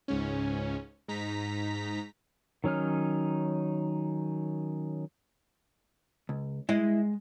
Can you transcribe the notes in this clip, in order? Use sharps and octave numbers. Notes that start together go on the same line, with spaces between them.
C#2 G#2 C#4
G#2 D#4 A#5 B6
D#3 F#3 C#4 D#4 F6
C#2
G#3 E4 D#5